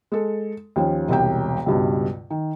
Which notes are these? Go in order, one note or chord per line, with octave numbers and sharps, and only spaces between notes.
G#3 A4
D#2 F3 C#4
E1 C2 G5
C#2 G2 B2
D#3